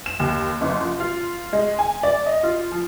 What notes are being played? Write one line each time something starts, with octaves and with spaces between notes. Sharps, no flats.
E7
D#2
F#1
F3
F4
G#3
G#5
D5
D#5
F4
F3